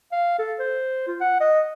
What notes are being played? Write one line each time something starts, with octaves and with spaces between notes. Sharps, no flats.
F5
A4
C5
F4
F#5
D#5